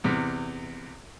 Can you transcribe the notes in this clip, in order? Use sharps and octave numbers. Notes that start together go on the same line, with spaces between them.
E2 C3